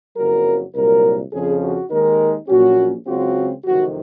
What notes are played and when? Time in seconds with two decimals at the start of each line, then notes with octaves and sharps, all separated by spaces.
0.17 F#1 F2 C#3 F#3 A#4
0.75 C2 A#2 F#3 A#4
1.32 F2 C#3 F3 G#4
1.62 F#4
1.91 D#2 D#3 G#3 D#4 A#4
2.48 A#1 A#2 F#3 C#4 F#4
3.07 C#2 C#3 F#3 C4 F4 F#4
3.65 F#1 F2 C3 D#3 F#4